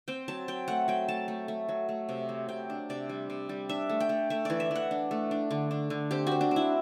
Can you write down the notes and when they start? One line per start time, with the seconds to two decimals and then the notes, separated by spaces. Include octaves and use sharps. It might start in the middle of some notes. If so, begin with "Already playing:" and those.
0.08 C4 G5
0.28 F#3 A5
0.48 F#3 G5
0.68 A3 F#5
0.88 F#3 G5
1.08 A3 A5
1.28 A3
1.48 A3
1.69 F#3
1.89 A3
2.09 C3
2.29 F#3
2.49 C3 G5
2.70 D4
2.90 C3 D5
3.09 G3
3.30 C3
3.49 G3
3.69 D4 E5
3.89 A3
4.00 G5
4.09 A3
4.30 A3 E5
4.45 E3 D5
4.60 E5
4.71 E3 F#5
4.91 D4
5.11 A3
5.31 D4
5.51 D3
5.71 D4
5.90 D3
6.11 C4 G4
6.27 C4 F#4
6.41 D4
6.51 C4
6.56 E4